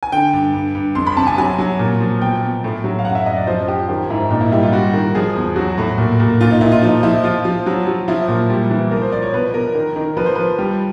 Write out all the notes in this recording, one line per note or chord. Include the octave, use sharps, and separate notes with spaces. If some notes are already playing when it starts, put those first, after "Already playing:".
G#5
D3 G5
G2
G2
G2
F2 C6
B5
C3 A5
G#5
F#3 G#5
F#3
A#2
F3
B2 G5
B2
A2
F#3
F5
F#2 F#5
E5
F#2 D#5
D5
F3 C5
F3 G4
D#3 G4
G#2 E4
A#2 D#4
E4
G3 E4
F4
G3 F#4
D#3
F3 G#4
E2
F#3 F#4
A2
A#2
A#2
A#2 F4
D#4
A#2 E4
F4
F3 D#4
F3 E4
F3 F4
F3
F#3
F#3
F3 E4
A#2
G3
E3
F3 A#4
C5
F3 D5
C#5
B2 B4
B2 A#4
D#3
D#3
F3 B4
C5
F3 B4
G3